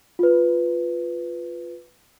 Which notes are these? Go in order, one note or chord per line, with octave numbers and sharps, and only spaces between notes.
F4 B4